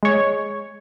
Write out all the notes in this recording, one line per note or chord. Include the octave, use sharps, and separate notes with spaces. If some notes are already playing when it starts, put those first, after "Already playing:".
G#3 C#5